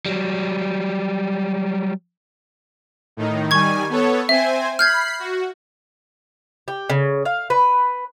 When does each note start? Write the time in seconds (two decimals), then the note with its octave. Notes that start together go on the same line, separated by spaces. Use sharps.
0.06 F#3 G3
3.17 A2 D#3 D#4
3.51 D#3 G3 G#5 C#6 G#6
3.89 B3 A4 C#5
4.29 C4 C5 E5 G#5
4.79 B5 F6 G6 G#6 C7
5.20 F#4
6.68 G4
6.90 C#3
7.25 F5
7.50 B4